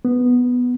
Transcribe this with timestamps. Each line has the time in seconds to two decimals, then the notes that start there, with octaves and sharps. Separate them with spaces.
0.05 B3